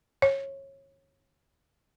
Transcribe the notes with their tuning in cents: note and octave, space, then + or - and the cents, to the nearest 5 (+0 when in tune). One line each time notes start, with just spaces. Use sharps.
C#5 -20